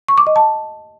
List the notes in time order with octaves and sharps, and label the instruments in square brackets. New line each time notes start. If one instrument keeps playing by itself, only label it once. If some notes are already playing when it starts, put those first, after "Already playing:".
[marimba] C#6
D6
D#5
A5